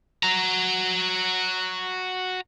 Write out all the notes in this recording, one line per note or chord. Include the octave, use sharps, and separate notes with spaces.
F#4 A#5